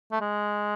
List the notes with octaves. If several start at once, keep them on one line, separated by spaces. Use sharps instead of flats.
A3
G#3